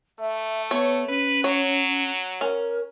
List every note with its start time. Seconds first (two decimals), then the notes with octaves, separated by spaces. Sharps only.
0.19 A3 E5
0.71 B3 C#5
1.09 C#4 B4
1.44 F#3 C#5
2.41 C#4 A#4